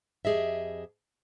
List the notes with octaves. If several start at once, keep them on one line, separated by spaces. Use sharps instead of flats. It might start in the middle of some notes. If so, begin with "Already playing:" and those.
F2 G4 G#4 D#5 E5